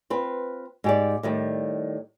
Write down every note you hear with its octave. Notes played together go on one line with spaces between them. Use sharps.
C4 F4 B4
G#2 G4 D5
A2 D#3 G3